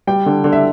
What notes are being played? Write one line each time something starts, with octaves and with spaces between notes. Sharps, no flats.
G3 G5
D3
D3
E5